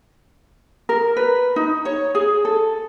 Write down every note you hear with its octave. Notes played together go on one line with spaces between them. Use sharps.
A#4
B4
D#4
C#5
G#4
A4